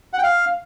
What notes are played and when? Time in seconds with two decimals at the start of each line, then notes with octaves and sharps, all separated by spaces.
0.13 F#5
0.18 G5
0.23 F5